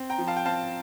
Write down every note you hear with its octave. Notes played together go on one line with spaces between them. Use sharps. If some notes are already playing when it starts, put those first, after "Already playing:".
Already playing: C4
G5 A#5
F3
F5 A5
G5
C4 F5 A5